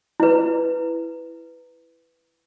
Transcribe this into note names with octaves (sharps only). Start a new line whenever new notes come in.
E4 B4